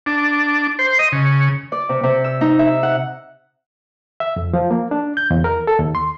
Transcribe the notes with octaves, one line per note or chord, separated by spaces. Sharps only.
D4
C5
D#5
C#3
D5
C3
C3
E6
D#4
E5
F#5
E5
F2
F3
A#3
D4
G6
E2
A#4
A4
D#2
C6